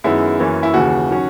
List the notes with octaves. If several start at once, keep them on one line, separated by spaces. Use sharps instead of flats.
F#2 D#3 G#3 B3 E4
F#2 E3 A#3 C#4
E4
D#2 C#3 E3 F#4
D#3 F#3 C#4